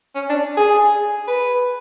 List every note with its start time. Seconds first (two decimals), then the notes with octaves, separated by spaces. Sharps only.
0.15 C#4
0.30 D4
0.57 G#4
1.28 B4